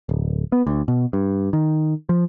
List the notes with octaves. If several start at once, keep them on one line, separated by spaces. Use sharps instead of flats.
D1
B3
D2
B2
G2
D#3
F3